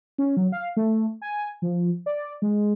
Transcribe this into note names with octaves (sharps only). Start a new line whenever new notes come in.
C#4
F#3
F5
A3
G#5
F3
D5
G#3